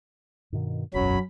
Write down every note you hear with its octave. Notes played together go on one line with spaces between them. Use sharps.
G2 B2 D#3
E1 B1 F#2 F#3 C#4 B5